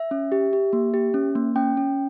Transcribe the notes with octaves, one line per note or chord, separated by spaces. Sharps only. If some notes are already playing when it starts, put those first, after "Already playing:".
Already playing: E5
C#4
G4
G4
A#3
G4
C#4
A#3
C#4 G5
C#4